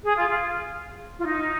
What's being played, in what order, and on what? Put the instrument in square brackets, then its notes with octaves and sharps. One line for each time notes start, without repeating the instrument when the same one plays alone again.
[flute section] G#4
F4
F4
F4
D#4